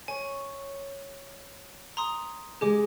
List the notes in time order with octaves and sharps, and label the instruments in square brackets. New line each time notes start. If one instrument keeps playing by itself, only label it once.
[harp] C#5 [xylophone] G#5
[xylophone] A#5 C6 D#6
[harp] G#3 G#4 [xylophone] G4 D6